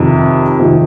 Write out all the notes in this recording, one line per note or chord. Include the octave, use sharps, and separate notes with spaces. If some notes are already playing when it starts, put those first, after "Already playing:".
Already playing: F2 C3 D#3
F2 C3 D#3